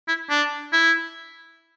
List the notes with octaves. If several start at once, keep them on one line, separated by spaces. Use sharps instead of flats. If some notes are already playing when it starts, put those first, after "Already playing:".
E4
D4
E4